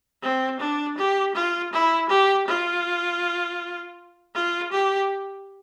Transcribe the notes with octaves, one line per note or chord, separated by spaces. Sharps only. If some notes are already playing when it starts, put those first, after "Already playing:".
C4
D4
G4
F4
E4
G4
F4
F4
G4